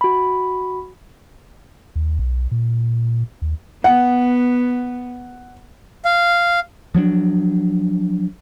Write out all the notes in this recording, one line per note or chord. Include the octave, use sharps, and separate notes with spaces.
F#4 B5
D#2
B1
A#2
D#2
B3 F#5
F5
F3 F#3 B3 D4